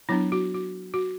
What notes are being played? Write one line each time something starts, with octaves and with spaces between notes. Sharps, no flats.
F#3 B3 D4 E4
F#4
F#4
F#4